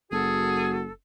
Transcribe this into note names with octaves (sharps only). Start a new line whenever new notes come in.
F#1 F#4 G#4 A4